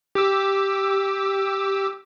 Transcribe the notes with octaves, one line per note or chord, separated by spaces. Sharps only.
G4 D6 E6